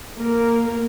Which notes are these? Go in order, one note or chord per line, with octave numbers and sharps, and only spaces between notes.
A#3 A#4